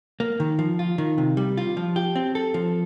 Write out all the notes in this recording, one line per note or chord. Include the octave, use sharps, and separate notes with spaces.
A#3
D#3
F3
F4
D#3
C3
G3
F4
F3
G4
C4
A4
F3